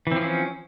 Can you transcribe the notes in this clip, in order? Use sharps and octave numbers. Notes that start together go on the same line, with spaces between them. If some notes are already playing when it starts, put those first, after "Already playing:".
E3 F3 C4 C#4